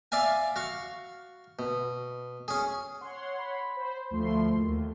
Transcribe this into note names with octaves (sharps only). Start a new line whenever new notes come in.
D5 E5 F5 G#5
F#4 F5 C#6
B2
C#4 G#4
C#5 F#5 C6
B5
C5
D2 F3 A3 C6
D#2